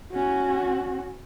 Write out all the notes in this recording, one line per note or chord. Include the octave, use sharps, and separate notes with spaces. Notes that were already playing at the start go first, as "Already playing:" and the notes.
C#4 F#4